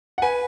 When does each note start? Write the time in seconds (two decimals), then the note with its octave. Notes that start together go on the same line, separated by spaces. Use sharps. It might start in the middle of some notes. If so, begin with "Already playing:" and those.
0.18 F#5
0.22 B4 G#5